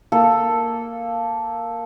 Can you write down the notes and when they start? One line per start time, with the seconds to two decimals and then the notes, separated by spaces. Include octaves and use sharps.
0.12 A#3 A4 D#6